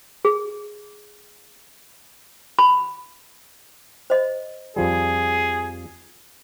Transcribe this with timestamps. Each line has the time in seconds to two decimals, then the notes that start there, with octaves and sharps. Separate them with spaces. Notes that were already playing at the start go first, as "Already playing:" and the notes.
0.25 G#4
2.59 B5
4.10 C5 D#5
4.76 F2 F3 G3 G#4